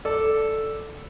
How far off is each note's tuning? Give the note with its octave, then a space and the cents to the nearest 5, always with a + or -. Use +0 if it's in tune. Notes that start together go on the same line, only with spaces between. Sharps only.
A4 +0 D5 +0